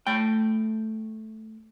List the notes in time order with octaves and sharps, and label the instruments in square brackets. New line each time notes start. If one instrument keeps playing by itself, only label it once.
[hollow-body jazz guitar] A3 G5